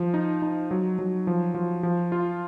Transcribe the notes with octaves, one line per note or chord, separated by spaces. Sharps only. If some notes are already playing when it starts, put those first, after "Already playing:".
Already playing: F3
D#4
D#4
F#3
F#3
F3
F3
F3
F4